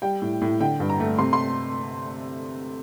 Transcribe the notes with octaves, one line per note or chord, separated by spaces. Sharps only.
G3 G5
A2
A2
D3 G5
G2
A#5
A3
C3 C6
C6